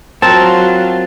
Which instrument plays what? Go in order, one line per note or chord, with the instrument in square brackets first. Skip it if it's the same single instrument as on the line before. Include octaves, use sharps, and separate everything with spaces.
[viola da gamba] F#3 F4 [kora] C4 A#4 [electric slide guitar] A5